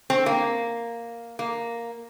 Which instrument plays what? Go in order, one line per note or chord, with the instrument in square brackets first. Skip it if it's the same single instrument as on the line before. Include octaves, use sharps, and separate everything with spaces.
[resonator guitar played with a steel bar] C4
A#3
A#3